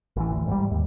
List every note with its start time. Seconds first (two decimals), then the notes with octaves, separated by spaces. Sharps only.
0.16 A1 E3
0.32 D2
0.47 G#2 G3
0.71 D#2